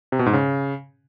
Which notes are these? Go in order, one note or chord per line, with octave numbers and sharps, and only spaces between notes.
C3
B2
G#2
C#3